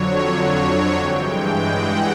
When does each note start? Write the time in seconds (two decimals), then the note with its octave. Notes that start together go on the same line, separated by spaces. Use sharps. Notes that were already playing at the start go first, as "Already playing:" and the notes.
Already playing: F2 D3 F#3 C#5
0.27 C#5
0.97 G2 E3 G#3 G5
1.67 F#5